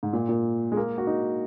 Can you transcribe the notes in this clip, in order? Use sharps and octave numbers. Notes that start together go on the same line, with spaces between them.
G#2
A#2
A#2
G#3
A#3
F#4
D#4